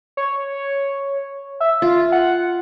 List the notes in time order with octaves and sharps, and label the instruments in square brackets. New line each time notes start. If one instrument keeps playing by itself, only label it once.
[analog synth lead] C#5
E5
[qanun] F4
[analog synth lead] F#5